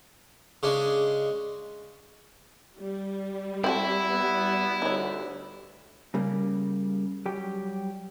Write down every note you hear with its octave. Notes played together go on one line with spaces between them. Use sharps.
C#3 G#3 D4
G3
C4 E4 F#4 A4
B3
D2 D#4 C#5
C#3 G3 A#3
F#3 G3 G4